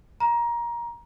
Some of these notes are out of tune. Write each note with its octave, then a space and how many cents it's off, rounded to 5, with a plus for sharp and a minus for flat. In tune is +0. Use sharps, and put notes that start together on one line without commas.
A#5 +20